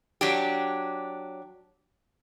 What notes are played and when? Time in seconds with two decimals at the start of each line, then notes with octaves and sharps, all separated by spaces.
0.21 F#3 D4 G4